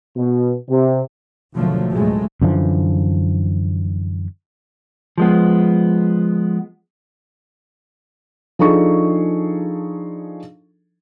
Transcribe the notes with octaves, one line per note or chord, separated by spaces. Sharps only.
B2
C3
G#1 B2 D3 F3 F#3 A3
A1 D2 F#3 G#3 A3
F#2 D3 E3 F3
F3 G#3 B3
F3 D4 D#4 G#4 A4 C#6